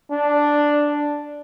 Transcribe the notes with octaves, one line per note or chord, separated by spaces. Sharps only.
D4